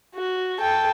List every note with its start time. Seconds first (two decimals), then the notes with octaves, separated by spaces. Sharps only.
0.15 F#4
0.60 A4 G5